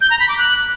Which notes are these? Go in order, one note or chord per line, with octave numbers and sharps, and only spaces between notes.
G6
A#5
B5
D6
F#6